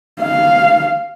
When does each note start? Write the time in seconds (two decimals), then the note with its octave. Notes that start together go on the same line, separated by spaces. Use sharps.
0.21 F5